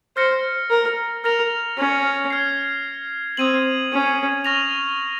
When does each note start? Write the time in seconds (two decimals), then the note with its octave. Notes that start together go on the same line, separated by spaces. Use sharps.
0.17 C5 F6 A#6 C#7
0.70 A#4
1.24 A#4 F6 A#6 F7
1.78 C#4
2.30 F6 G#6 C7
3.37 C4 D#6 G#6 D#7 F#7
3.92 C#4
4.44 C#6 F6 A#6 F7